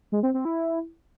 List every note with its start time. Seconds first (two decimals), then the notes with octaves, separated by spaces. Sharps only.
0.12 G#3
0.23 C4
0.34 C4
0.45 E4